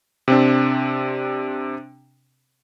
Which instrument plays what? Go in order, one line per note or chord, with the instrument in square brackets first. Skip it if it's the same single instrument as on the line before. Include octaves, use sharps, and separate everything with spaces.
[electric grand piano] C3 C4 D4